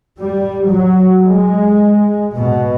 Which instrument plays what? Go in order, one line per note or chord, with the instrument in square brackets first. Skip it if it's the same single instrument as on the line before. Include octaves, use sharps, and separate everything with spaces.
[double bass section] G3
F#3
G#3
B2